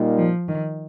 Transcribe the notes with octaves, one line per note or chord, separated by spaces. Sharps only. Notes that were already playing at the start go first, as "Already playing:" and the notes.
Already playing: A#2 G3 A#3 D#4
F3
D#3